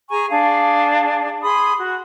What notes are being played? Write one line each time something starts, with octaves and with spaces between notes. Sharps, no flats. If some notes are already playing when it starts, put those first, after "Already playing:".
G#4 G#5 A#5 C#6
D4 G#4 F5
G#4 B5 C6 D#6
F#4